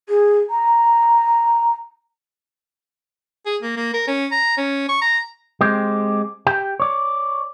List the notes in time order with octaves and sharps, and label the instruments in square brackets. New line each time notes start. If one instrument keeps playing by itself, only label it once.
[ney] G#4
A#5
[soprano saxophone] G#4
A#3
A#3
A#4
C#4
A#5
C#4
C#6
A#5
[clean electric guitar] G#3 C4 G4
G4 G5
C#5 D5